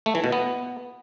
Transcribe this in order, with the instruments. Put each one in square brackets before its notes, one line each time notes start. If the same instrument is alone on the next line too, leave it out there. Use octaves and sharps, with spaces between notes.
[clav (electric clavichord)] A3
E3
B2
B3